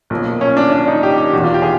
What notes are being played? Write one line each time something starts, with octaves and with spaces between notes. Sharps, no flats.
B1 A#2 F3
C#4
D4
D4
D#4
G4
G4
F1 E2 B2 F#4
F4
G4
G#4